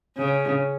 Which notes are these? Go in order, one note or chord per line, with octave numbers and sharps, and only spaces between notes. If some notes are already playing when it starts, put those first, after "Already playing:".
C#3